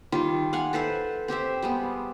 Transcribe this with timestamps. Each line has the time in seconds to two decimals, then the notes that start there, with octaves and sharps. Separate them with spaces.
0.12 D#3 G3 F4
0.53 F5 F#5 G#5
0.73 A4 B4 C5 E5
1.28 C4 G4 C5 E5
1.62 G3 G#3 B3